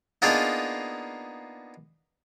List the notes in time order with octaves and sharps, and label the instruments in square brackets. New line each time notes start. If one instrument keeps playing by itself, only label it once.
[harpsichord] A#3 B3 D4 D#4 F4 G#4